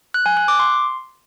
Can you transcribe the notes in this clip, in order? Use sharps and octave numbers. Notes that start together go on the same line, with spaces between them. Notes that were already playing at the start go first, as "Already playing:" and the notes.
F#6
G#5
F#6
D6
C6